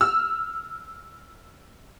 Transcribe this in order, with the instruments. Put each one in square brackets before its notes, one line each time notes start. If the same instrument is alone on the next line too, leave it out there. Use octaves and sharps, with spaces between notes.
[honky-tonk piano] E6 F6